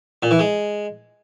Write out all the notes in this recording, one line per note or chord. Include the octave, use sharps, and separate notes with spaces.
A#2
E3
G#3